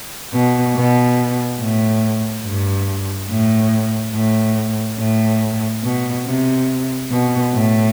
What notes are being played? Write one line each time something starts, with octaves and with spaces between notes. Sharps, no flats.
B2
B2
A2
G2
A2
A2
A2
B2
C3
B2
A2